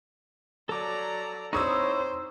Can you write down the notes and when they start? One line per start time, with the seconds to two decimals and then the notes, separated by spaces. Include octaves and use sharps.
0.69 F#3 A4 D5 A#5 D6
1.53 C4 D#4 E4 C5 C#5 C#6 D#6 E6